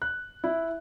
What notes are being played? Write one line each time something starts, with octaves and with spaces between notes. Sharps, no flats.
F#6
E4